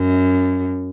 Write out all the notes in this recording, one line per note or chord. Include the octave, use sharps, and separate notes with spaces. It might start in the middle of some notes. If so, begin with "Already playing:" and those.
Already playing: F#2